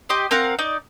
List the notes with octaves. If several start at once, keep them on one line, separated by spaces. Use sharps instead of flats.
G4 D#5 C6
C4 A#4 F5 F#5
D#4 D5